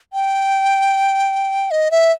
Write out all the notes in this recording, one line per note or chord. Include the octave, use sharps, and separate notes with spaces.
G5
D#5
E5